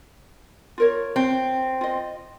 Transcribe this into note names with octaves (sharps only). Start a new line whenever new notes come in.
F4 A#4 C#5
C4
F4 D#5